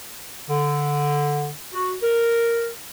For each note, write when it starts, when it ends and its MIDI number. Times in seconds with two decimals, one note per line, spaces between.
0.49 1.49 50
1.74 1.93 66
2.02 2.69 70